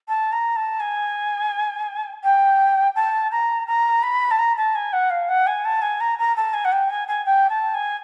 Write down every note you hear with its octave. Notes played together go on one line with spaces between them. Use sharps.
A5
A#5
A5
G#5
G5
A5
A#5
A#5
B5
A5
A#5
A5
G#5
F#5
F5
F#5
G#5
A5
G#5
A#5
A#5
A5
G#5
F#5
G5
G#5
G#5
G5
A5
G#5